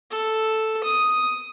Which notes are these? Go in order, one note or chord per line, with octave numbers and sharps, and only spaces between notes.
A4
D#6